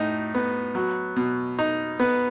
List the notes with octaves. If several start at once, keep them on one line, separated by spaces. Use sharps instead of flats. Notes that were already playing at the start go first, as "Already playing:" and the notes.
Already playing: A2 D#4
B3
F#3
B2
D#4
B3